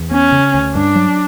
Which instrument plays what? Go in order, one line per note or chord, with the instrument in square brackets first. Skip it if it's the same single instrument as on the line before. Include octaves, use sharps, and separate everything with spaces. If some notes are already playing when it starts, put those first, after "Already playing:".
Already playing: [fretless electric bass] E2
[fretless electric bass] B3 [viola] C#4
[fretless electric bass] C#3
D2
[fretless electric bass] G2 [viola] D4
[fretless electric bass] F#3